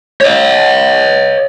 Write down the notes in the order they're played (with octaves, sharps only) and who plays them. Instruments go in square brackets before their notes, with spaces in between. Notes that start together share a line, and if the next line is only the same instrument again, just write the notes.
[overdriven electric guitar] C#5 D#5